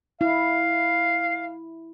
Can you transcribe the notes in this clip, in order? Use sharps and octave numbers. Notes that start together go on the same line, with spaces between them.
E4 F5